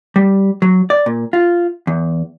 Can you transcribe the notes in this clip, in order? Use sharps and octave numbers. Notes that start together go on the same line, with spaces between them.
G3
F#3
D5
A#2
F4
E2